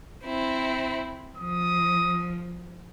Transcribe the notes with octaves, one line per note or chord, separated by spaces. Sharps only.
C4 E4
F3 D#6